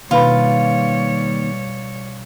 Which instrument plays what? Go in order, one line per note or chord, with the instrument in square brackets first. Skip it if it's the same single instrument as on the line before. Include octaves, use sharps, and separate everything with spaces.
[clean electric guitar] D#2 [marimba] B2 B4 B5 [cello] G3 C#5 [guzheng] F4